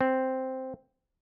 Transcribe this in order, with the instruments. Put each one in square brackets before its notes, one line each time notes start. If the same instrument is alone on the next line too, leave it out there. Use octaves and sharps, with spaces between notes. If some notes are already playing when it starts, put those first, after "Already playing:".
[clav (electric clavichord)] C4